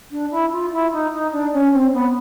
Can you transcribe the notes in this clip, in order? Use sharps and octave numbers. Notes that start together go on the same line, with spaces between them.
D4
E4
F4
E4
D#4
D#4
D4
C#4
C4
B3